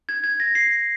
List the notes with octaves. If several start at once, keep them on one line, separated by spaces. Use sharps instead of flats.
G#6
G#6
A#6
C7